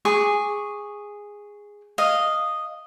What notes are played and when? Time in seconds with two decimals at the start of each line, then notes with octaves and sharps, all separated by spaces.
0.05 G#4 C#6 D6
1.98 D#5 F5